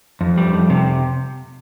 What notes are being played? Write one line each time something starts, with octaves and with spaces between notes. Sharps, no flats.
F2
G3
F2
C3